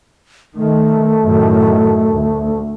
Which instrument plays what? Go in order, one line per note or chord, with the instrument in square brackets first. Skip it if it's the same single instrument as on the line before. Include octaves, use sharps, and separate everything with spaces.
[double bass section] D#3 [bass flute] A3
[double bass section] F#2 A2 D#3
D2